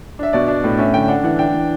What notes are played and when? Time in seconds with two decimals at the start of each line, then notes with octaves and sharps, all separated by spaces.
0.19 D4 E5
0.33 B2 D5
0.48 D4
0.64 A2
0.79 C#4 E5
0.94 D3 G5
1.08 D4 F#5
1.24 E3 F#5
1.39 D4 G5
1.54 E3